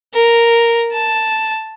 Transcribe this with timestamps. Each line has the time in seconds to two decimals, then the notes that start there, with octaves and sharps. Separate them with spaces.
0.14 A#4
0.92 A5